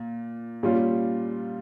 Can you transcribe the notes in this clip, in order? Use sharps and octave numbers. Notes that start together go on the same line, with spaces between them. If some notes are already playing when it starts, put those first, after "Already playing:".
Already playing: A#2
A#2 G3 C#4 F4